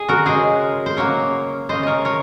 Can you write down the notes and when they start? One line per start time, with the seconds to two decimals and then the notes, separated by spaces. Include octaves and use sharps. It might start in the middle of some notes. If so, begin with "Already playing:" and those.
Already playing: G#4
0.09 F#4 A#4
0.26 C#3 G#3 G#4 C5
0.86 C5
0.97 C#3 F#3 A#3 A#4 C#5
1.69 C#3 G#3 C5 D#5
1.83 A#4 C#5 D#5
2.05 A#4 C#5